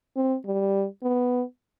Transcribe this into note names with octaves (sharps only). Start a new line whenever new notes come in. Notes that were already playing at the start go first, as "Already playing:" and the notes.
C4
G3
B3